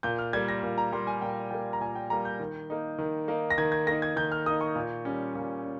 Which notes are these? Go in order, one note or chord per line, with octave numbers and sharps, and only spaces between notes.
A#2 G6
F6
G3 A#3 G#6
A#6
A#2
A#5
G3 A#3 C6
G#5
A#2 G5
G3 A#3 G5
A#5
A#2 G#5
G5
G3 A#3 A#5
G6
D#3
A#3 D#4
D#3
A#3 D#4
A#6
D#3 G#6
G#6
A#3 D#4 A#6
G#6
D#3 G6
F6
A#3 D#4 D#6
C#6
A#2
G3 C#4
A#2
C#4